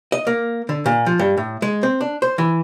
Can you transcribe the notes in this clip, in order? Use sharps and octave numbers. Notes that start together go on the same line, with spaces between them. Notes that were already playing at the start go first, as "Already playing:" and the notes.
D#5
A#3
D3
A#2
F3
G2
A2
G#3
C4
D4
C5
E3